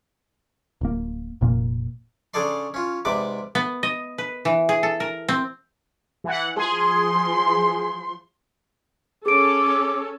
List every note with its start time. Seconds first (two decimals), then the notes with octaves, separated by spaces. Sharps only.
0.81 D1 A#3
1.41 F1 A#2 A#3
2.34 C#3 D4 G#4 A4 D5 C6
2.74 C#4 F4
3.05 G#2 C3 B4 D5 D6
3.55 B3
3.83 D#5
4.18 B4
4.45 E3
4.69 G#4
4.83 A4
5.00 A#4
5.29 C4
6.24 E3 F#5
6.57 F3 G#4 C6
9.26 C#4 G#4 A4 D6 D7